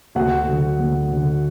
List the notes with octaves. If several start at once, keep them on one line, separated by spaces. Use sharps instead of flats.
D2 F#4 F#5
D3 F#3
D2
D3 F#3